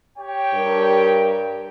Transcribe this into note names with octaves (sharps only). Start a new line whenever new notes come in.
G4 C#5 G5
G2 A#4